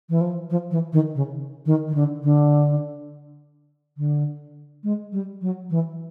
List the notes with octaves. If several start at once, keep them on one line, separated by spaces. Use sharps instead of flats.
E3
F3
F3
E3
D#3
C#3
D#3
D#3
D3
D3
D3
G#3
G3
F#3
E3